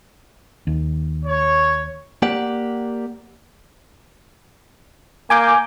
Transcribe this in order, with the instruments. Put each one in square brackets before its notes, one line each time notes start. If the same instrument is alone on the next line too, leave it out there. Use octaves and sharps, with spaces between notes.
[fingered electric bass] D#2
[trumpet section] C#5
[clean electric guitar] A#3 G4 D5 F#5
[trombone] A#3 [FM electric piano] G#5 D6 G6